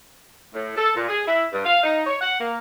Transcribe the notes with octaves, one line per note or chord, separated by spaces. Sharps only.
A2
A4
A#2
G#4
E4
G2
F5
D#4
C#5
F#5
A#3